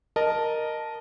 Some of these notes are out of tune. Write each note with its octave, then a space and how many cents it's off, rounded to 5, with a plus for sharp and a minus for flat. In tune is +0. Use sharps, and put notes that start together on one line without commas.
A#4 +0 D#5 -15 A5 +0